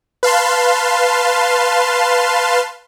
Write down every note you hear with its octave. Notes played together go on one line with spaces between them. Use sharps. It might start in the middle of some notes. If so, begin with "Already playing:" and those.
B4 F5 A5 C6